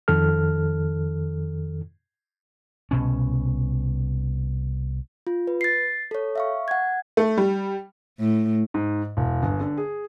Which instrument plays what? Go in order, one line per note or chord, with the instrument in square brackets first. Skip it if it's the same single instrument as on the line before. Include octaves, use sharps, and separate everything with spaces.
[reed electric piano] F2 D#3 A4 F6
[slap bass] C2 B2 C#4
[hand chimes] F4
B4
A6 C7
A4 C#5
E5 F5 C#6
F#5 G#6
[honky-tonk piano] A3
G3
[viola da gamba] A2
[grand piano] G#2
E1
G1
D3
G#4